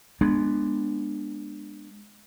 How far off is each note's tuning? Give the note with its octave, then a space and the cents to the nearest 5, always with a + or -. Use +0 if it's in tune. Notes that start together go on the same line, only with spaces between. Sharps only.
G#3 +0 B3 -10 D4 +20